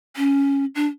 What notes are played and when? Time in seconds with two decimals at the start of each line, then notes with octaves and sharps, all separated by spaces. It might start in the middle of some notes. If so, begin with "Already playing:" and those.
0.16 C#4
0.75 D4